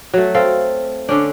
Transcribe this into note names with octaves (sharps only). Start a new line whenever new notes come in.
F#3 A3
C4 A4 F5
D3 C#4 D4